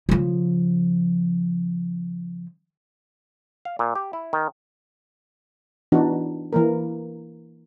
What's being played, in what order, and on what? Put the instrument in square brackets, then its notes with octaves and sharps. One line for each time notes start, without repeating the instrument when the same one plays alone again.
[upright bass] C#3 F3
[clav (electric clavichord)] F5
A#2
G4
E4
D#3
[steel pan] E3 B3 D4 D#4 F#4
E3 A#3 A#4